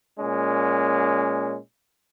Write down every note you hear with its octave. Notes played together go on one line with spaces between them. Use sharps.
A#2 G#3 C#4